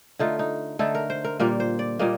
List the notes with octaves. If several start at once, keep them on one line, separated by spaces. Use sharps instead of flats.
D3 A3 D#4 F4
D#4
D3 A3 D#4 A4
A#4
C5
A#4
A#2 G3 A#3 A#4
C5
D5
A#2 G3 A#3 D#5